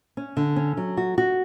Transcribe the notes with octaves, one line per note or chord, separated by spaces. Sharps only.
C#4
D3
C#4
F#3
F#4
F#4